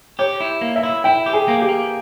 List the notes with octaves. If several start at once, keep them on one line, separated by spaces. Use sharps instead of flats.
G4 C#5
E4
A#3
E5
E4
E4 G5
G4
G#4
A#3
G4
A#3